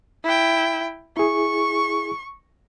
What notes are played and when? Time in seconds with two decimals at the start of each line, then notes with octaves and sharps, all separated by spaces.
0.24 E4 G5
1.17 E4 G#4 C#6